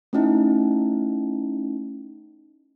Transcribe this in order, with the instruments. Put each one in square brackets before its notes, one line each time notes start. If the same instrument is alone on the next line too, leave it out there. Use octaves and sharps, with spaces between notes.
[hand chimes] A3 C#4 D#4 E4